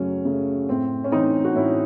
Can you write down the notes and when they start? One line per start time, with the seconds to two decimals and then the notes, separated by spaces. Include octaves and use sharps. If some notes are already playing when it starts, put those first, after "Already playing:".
Already playing: F#2 C#3 F#3 A3 C#4
0.25 C#3 F#3 A3
0.69 A2 C4
1.04 C#4
1.12 E3 A3 C4 D#4
1.45 F#4
1.55 A2 C#4 E4